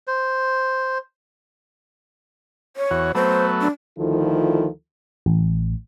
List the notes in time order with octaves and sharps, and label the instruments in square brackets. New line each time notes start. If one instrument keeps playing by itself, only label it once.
[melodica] C5
[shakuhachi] C#5
[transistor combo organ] E2 F#4
[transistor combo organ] F#3 A3 B3 [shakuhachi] C5
[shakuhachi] D4
[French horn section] D2 D#3 F3 E4 F4 A4
[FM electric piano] A1